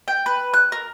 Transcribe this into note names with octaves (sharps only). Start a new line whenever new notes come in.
G5
B4
F#6
A#4